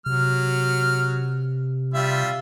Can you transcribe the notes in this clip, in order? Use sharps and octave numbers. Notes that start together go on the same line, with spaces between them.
C3 F#3 F6
G3 F4 E5